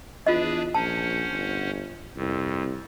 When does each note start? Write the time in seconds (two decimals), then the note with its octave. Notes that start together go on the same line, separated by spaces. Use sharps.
0.27 E2 D4 F4 G#4 B4 D#5
0.75 A#1 C#4 C5 F#5 A5
1.32 G1
2.17 C2 F2